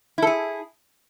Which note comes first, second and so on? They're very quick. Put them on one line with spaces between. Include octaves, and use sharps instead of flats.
E4 A4 G#4